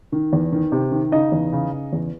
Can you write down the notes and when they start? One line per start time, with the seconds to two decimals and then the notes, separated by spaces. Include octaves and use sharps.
0.12 D#3
0.33 E2
0.52 D#3
0.72 C3
0.92 D#3
1.12 C#3 D#4 D#5
1.32 E2
1.52 C#3
1.72 C#3
1.93 E2